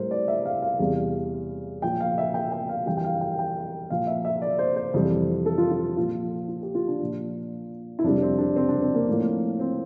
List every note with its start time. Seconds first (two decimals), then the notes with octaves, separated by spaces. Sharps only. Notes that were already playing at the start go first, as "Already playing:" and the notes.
Already playing: A2 G3 A#4 C5
0.11 D5
0.28 E5
0.45 F5
0.62 F5
0.79 E2 C3 G3
1.82 A#2 F3 G5
2.00 F5
2.18 E5
2.34 G5
2.52 G5
2.69 F5
2.86 F2 E3 G3 G5
2.97 G5
3.04 F5
3.21 G5
3.39 G5
3.90 A#2 F3 F5
4.07 E5
4.25 E5
4.42 D5
4.58 C5
4.76 C5
4.94 F2 C3 E3 G3
5.46 A4
5.58 F4
5.71 F4
5.97 A#2 F3 F4
6.48 F4
6.62 G4
6.75 F4
6.88 D4
7.01 A#2 F3
7.99 E4
8.04 F2 C3 G3 D4
8.22 C4
8.38 D4
8.56 C4
8.69 D4
8.82 C4
8.95 A#3
9.08 A2 F3
9.60 C4